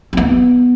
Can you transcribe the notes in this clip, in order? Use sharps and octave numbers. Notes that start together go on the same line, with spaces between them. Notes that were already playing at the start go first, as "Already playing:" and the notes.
C4
B3